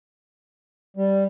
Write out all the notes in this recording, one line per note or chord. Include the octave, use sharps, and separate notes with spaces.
G3